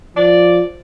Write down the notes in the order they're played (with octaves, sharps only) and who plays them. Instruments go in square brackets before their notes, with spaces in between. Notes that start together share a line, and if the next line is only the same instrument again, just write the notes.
[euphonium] F3 [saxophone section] D5